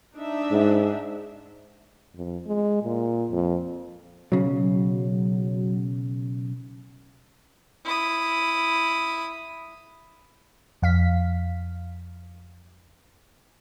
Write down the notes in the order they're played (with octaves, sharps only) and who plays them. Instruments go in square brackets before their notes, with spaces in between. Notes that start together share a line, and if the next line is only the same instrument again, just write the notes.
[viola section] D4 D#4 E5
[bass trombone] G#2
[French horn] F2
G#3
A#2
F2
[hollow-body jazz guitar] B1 C#3 [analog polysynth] F#3
[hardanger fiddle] E4 D#6
[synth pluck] F2 F5 B6